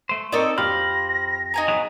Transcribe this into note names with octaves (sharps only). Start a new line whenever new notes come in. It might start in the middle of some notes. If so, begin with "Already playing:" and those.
A3 C5
C4 D#4 A4 A#4 C#5 D5
F2 G4 C5 F5 B5 F6 A#6
D#4 G#5 A#5
F#3 B3 G#4